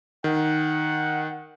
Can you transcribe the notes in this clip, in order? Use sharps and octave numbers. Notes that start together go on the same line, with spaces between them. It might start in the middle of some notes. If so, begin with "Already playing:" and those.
D#3 F#5